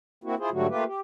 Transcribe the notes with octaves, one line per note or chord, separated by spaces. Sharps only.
A#3 C4 E4 F#4
E4 F4 G#4 C5
G#2 D3 F#3 G3 A3 F#4
A3 A#3 F4 G4 B4
G4